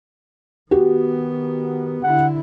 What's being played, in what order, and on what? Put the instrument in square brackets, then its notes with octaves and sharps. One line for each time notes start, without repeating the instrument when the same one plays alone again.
[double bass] D#3 B3 [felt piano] F#4 G4
[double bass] D3 E4 [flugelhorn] F#5